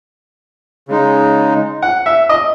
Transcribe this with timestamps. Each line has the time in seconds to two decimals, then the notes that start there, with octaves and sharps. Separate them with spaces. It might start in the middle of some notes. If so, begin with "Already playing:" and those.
0.88 C#3 G#3 D#4
1.82 F#5
2.06 E5
2.29 D#5